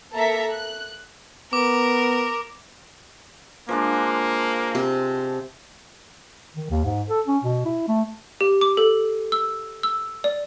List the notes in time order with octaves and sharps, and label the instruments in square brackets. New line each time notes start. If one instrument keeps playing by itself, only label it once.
[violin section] A#3 A4 E5 A#5 B6
F#6
[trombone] B3 [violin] A#4 [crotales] D6
[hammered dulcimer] F3 G#3 D4 [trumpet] A#3
[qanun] C3
[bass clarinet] D#3
D#2
G#2
A4
C#4
B2
E4
A3
[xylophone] G4
D6
A4
E6
E6
D5